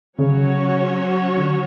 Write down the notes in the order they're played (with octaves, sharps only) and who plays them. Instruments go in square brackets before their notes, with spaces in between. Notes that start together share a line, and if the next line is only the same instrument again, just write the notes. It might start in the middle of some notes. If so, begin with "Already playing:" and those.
[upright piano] C#3 [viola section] F#3 C#4 F#4 C#5
[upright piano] D3